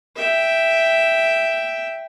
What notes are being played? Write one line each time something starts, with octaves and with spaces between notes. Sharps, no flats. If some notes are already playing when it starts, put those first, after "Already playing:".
E5 G5